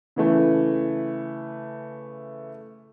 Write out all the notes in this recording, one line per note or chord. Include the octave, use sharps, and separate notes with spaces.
C#3 E3 A3